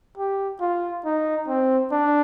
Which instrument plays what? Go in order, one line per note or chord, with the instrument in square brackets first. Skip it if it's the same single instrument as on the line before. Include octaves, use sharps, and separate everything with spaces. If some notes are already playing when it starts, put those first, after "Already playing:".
[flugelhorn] G4
F4
D#4
C4
D4